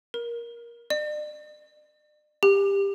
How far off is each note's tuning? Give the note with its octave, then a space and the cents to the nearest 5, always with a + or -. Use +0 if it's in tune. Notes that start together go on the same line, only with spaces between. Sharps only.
A#4 +15
D5 +40
G4 +20